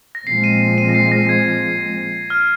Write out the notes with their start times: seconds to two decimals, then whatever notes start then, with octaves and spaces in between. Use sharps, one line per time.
0.15 A#6
0.27 A#2 F3 G#3 C4 C7
0.44 D#7
0.78 D#7
0.89 A#6
0.94 C7
1.12 A#6
1.29 G#6
2.30 F6